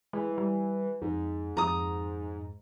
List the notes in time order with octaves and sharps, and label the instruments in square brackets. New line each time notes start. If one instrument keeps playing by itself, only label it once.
[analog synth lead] E3 [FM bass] G#3
[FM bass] G3
[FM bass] F2 [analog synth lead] G#2
[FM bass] F2 [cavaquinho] A#5 D#6